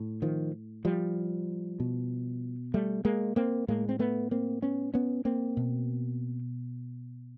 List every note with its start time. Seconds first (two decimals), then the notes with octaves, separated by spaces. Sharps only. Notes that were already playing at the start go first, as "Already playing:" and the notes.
Already playing: A2
0.22 D#3 F3
0.85 F3 G3
1.80 B2
2.74 G3 A3
3.05 G#3 A#3
3.36 A#3 C4
3.68 A2 G#3 A#3
3.89 C4
3.99 A3 B3
4.31 A#3 C4
4.62 B3 C#4
4.94 B3 C#4
5.25 A#3 C4
5.57 B2